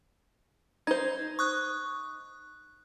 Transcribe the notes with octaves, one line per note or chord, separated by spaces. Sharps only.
D#4 C5 G#6
C#6 D#6 F#6